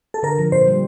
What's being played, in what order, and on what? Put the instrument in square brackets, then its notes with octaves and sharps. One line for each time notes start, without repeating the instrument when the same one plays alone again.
[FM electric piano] A4
[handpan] D3 [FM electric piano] A#4
[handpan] F3
[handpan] A#2 [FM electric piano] C5
[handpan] G3